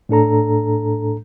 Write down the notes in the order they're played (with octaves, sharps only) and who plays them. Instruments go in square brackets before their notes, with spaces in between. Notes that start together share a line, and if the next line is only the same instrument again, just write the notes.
[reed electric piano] A2 D4 A4 A#5